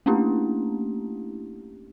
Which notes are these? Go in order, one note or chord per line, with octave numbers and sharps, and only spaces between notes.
A3 A#3 C#4 D4 E4 G4